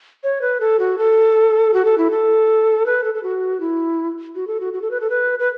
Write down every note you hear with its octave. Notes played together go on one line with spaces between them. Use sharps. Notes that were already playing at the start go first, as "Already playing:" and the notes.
C#5
B4
A4
F#4
A4
F#4
A4
E4
A4
B4
A4
A4
F#4
E4
F#4
A4
F#4
F#4
A4
B4
A4
B4
B4